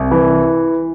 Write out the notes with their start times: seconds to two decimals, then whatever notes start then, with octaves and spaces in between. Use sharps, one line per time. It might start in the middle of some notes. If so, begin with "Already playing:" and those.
Already playing: C2
0.11 E3